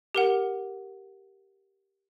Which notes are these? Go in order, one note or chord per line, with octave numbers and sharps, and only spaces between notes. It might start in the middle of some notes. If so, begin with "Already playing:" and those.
G4 A#4 F#5